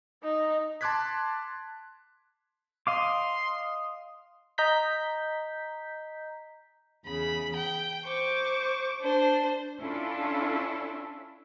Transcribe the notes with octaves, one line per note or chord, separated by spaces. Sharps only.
D#4
A5 C6 D6 F#6 G#6 B6
D#5 F5 C6 D6
D#5 A#5 G6 B6
E2 C#3 B5
G5
C5 C#6 D6
D4 C5
C#4 D4 E4 F4 A4